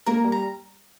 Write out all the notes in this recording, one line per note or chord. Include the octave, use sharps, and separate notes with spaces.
A#3 A#4 A#5
G3
A#5